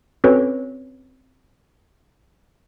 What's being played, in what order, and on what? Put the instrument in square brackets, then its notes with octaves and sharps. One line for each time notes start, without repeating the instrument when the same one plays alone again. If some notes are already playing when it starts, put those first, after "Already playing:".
[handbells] C4 C#4 F#4 A4 B4 C#5